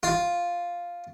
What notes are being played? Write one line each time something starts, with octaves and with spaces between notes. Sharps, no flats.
F4